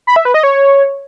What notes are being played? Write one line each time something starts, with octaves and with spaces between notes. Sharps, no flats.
B5
E5
B4
D#5
C#5